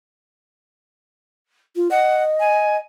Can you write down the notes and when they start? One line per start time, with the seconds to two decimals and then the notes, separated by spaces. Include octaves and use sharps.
1.75 F4
1.91 D#5 F#5
2.40 G#5